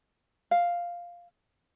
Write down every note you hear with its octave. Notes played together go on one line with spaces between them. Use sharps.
F5